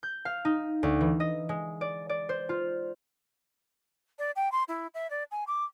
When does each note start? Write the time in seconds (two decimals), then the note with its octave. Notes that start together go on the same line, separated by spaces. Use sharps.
0.03 G6
0.25 F5
0.45 D#4
0.83 D2
1.01 E3
1.20 D#5
1.49 G#3
1.81 D5
2.09 D5
2.29 C5
2.49 F4
4.19 D5
4.36 G5
4.52 C6
4.68 E4
4.94 E5
5.10 D5
5.31 G#5
5.47 D6